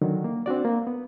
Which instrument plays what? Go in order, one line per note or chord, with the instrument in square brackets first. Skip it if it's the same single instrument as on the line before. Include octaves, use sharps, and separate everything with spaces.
[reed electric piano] D3 D#3 F#3
A#3
C4 D4 F#4 D5
A#3
B3